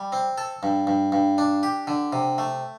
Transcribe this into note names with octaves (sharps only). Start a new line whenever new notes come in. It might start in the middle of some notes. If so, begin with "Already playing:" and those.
Already playing: G3
C4
A4
G2
G2
G2
D4
G4
D3
C3
A3